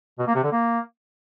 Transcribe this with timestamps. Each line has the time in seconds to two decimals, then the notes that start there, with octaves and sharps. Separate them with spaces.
0.19 B2
0.27 A#3
0.35 C3
0.44 D3
0.52 A#3